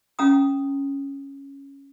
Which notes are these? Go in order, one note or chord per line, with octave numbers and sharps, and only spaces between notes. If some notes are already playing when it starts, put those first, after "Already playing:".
C#4 F5 A#5 D#6